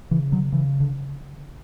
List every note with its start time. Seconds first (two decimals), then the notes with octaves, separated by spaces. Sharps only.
0.11 C#3 E3
0.32 D3 F#3
0.52 C#3 E3
0.80 D3